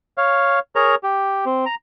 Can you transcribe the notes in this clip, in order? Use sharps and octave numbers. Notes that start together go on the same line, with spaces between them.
C#5 F5
G#4 A#4 C#5 A#5
G4
C4
A#5